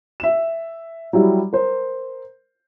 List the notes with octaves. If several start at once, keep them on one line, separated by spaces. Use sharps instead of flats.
E5 E7
F#3 G3 E4 G4
A#4 C5